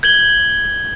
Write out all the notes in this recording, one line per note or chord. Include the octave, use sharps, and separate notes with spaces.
G6 G#6 F#7 G7